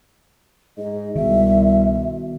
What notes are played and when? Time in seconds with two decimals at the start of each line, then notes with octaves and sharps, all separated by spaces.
0.78 G#2 D#5
1.15 C2 B2 D#3 E5